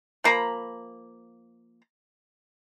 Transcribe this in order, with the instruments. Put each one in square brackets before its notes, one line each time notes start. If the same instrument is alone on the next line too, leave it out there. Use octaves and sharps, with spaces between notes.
[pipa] F3 A#3 A#5 B5